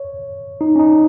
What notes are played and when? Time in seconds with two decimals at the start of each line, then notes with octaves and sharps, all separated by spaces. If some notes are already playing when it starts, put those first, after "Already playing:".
Already playing: C#5
0.61 D#4
0.76 C#4
0.79 D#4